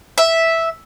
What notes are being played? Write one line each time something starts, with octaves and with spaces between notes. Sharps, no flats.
E5